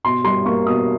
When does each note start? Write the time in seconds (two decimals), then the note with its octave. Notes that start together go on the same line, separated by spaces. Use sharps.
0.04 B2 C6
0.24 G3 C6
0.46 A#3 C#6
0.66 B2 D#6